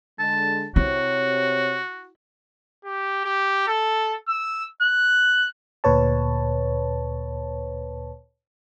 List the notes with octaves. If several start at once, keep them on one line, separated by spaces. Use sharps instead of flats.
D3 G#3 A5
C3 E4 F#4 C#5
G4
G4
A4
E6
F#6
D2 A#2 B4 C#5 A5